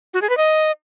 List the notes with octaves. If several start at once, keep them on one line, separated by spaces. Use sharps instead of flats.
F#4
G#4
B4
D#5